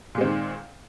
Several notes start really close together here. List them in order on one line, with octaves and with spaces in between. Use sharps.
A#2 G#3 C4 D#3